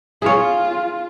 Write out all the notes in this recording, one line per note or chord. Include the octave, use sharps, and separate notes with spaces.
F4 G#4 C#5